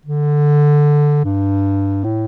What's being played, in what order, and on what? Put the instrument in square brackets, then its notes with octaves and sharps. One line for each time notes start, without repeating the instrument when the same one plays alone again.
[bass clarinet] D3
G2
A2